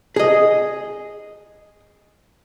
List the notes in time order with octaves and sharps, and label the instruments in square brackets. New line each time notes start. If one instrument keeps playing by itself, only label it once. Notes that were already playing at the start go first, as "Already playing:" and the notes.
[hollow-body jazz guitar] G#4 D#5